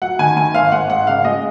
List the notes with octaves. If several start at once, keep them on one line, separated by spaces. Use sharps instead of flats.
F#3 F#5
D#3 G#5
D#3 G#5
G#1 F5
G#1 F#5
G#2 F#5
C#3 F5
G#3 D#5